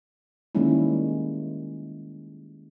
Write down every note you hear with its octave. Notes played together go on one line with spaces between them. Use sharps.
D#3 G3 G#3 A#3 C#4 E4